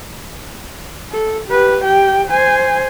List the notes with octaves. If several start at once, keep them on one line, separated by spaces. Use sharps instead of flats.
A4
G4 B4
G4 G5
C5 G#5